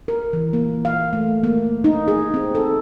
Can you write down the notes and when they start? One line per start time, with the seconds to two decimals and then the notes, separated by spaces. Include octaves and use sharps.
0.08 A#4
0.33 E3
0.53 A#3
0.85 F5
1.13 A3
1.44 A#3
1.84 D#4
2.08 G#4
2.34 C4
2.55 A4